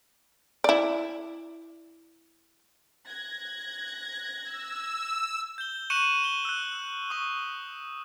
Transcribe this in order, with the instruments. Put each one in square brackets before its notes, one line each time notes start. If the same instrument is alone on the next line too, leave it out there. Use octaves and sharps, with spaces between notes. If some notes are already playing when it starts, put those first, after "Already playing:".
[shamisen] E4 D5
[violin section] F#6 G#6 A#6
[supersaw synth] E6
[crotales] G6 G7
C#6 F#6 C#7 D#7 E7 F#7
D#7 G7
E6 F#6
C#6 D#6